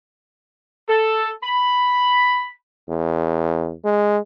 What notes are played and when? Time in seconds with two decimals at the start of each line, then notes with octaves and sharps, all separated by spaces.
0.89 A4
1.43 B5
2.89 E2
3.84 G#3